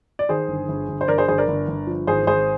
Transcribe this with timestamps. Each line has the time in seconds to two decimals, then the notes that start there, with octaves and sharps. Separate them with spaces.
0.19 D5
0.29 D#3 G#4 C5
0.48 G1
0.69 G1
0.88 G1
1.01 C5
1.08 G1 A#4 D5
1.18 G#4 C5
1.28 G1 G#4 C5
1.38 A#4 D5
1.48 G1
1.68 G1
1.87 F3
2.07 G#1 G#4 C5
2.27 G#1 G#4 C5